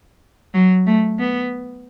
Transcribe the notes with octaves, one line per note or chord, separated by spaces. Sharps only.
F#3
A3
B3